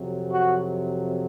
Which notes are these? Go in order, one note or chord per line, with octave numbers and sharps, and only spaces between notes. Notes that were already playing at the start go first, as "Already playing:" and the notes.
Already playing: F2 C3 F#3
F#4